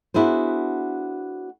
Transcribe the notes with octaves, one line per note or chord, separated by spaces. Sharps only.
B3 D4 E4 F#4 G#4 C5